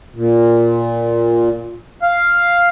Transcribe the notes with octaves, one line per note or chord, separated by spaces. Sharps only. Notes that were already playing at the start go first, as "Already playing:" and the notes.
A#2
F5